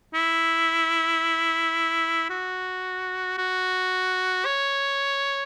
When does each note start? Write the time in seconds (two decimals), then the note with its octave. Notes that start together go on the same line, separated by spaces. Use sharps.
0.14 E4
2.30 F#4
3.38 F#4
4.45 C#5